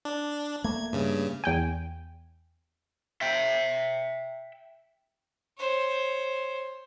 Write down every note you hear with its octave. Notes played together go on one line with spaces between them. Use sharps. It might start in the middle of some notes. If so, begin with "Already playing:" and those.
D4
A3 A#3 G#6
G2 C#3
E2 G5 G#5
E5 G5
C5 C#5